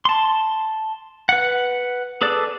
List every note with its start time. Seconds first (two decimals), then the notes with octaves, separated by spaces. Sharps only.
0.05 A5 C6
1.29 B4 F#5
2.22 G#4 A4 B4 D5